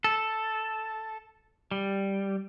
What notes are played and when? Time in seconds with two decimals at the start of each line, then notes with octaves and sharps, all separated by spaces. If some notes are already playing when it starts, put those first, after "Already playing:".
0.04 A4
1.71 G3